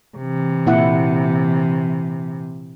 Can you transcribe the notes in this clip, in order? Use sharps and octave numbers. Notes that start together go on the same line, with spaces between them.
C3 E3
A#2 E4 F#5